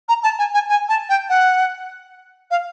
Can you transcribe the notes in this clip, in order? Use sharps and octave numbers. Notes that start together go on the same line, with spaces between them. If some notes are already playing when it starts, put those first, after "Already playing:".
A#5
A5
G#5
G#5
G#5
A5
G5
F#5
F5